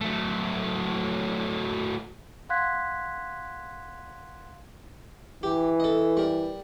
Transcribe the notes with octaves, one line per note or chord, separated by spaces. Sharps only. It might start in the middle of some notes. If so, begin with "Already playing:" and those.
F#3 A3
F5 F#5 C6 F#6 G#6 B6
E3 G4
A4 D#5
G3 A#4